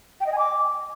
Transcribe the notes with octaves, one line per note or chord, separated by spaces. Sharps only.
G5
D#5
G#5
D6